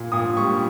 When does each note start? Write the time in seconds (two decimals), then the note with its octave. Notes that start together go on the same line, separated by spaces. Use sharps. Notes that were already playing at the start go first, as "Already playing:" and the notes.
Already playing: A#2
0.12 A#2 D#6
0.37 G3 C#6